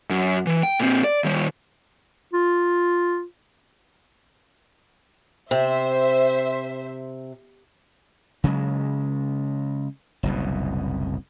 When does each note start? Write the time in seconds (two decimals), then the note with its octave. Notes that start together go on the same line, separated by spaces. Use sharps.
0.10 F#2
0.47 E3
0.63 G5
0.80 A#2 C4
1.04 D5
1.24 D#3 G3
2.33 F4
5.51 C3 C5 E5
8.44 C#3 F#3 G#3
10.23 F#1 C2 B2